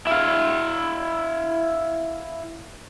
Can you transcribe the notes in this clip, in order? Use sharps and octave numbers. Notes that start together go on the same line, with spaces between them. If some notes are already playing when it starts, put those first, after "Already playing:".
E4 F5